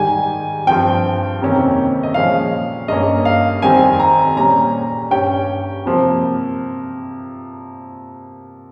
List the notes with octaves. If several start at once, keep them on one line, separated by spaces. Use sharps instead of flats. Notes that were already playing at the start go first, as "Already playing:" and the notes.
Already playing: G#2 D#3 G3 G#5
G2 F3 C4 G5
F2 C3 D#3 A#3 C#4
D#5
A#2 F3 G#3 C#4 F5
G2 G3 A#3 C#4 D#5
F5
F2 D#3 G3 C4 G#5
A#5
A#2 G3 C#4 A#5
G2 G3 C#4 G5
C3 F3 A#3